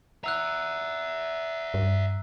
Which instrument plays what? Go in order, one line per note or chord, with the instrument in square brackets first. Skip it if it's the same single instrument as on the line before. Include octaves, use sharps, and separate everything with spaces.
[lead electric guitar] E5 F#5 [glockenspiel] A#5 E6 F#6
[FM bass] G2